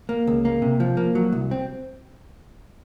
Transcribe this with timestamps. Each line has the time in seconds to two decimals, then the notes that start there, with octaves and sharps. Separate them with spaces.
0.09 A#3
0.27 C#2
0.45 A#3
0.62 C3
0.80 F3
0.97 A#3
1.15 F#3
1.32 C2
1.51 C4